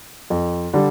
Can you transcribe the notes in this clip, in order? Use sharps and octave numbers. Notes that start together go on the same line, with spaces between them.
F2
D3 G3